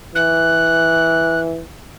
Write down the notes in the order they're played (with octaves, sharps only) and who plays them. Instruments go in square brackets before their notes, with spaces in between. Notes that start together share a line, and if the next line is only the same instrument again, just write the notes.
[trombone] E3 [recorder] F#6